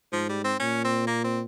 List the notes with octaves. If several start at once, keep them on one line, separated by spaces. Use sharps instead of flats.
G#2 F3
G3
C4
A#2 C#4
C4
A#3
C4